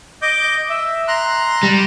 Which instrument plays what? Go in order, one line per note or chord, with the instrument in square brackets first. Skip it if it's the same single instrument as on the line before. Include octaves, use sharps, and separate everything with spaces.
[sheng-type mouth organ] D#5 D6 G6
E5
A#5 C6 F#6
[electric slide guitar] G3 [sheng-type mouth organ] A#5